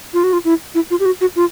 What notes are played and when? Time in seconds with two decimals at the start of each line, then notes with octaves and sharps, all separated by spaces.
0.14 F4
0.24 F#4
0.33 F4
0.45 E4
0.75 E4
0.91 F4
1.00 G4
1.06 F#4
1.21 F#4
1.36 F4